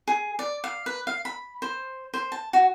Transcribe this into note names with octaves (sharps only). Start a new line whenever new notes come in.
G#4
D5
F5
B4
F5
B5
C5
C5
A5
F#4